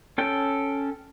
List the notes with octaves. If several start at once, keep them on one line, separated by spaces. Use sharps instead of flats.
C#4 A4 G5